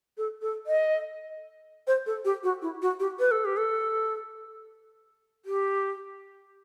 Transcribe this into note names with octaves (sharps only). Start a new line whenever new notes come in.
A4
A4
D#5
C5
A4
G4
F#4
E4
F#4
G4
B4
A4
G4
A4
G4